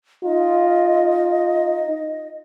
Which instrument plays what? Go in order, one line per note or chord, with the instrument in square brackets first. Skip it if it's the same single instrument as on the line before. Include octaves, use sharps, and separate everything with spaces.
[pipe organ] D#4 [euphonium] F4 [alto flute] D#5